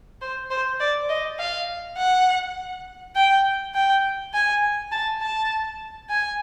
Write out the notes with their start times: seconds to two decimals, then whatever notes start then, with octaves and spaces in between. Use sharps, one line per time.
0.21 C5
0.50 C5
0.80 D5
1.09 D#5
1.39 F5
1.98 F#5
3.16 G5
3.74 G5
4.34 G#5
4.92 A5
5.22 A5
6.09 G#5